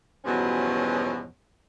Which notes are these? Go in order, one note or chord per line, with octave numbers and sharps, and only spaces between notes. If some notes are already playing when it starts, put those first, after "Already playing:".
E2 G2 B2 F3 F#3 C#4